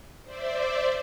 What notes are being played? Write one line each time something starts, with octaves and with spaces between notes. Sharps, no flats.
C5 D5 E5